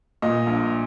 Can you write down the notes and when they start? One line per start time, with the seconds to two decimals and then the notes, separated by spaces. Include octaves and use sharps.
0.22 A#2 D#5
0.47 A#1